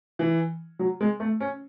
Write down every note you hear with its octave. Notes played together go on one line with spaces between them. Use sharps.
E3
F#3
G#3
A3
C#4